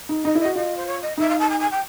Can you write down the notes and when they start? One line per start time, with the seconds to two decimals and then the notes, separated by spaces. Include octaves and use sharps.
0.09 D#4
0.24 D#4 D#5
0.35 E4
0.40 D#5
0.45 F#4
0.55 F4 D#5
0.77 C5
0.86 C#5
1.02 D#5
1.18 D#4 E5
1.29 F5
1.39 A5
1.49 G#5
1.60 G#5
1.71 G5